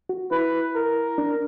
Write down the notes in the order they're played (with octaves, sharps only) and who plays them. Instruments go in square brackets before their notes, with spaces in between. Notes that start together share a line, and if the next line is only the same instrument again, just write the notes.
[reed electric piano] F#4
[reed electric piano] E4 [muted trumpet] B4
[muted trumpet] A#4
[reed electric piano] D4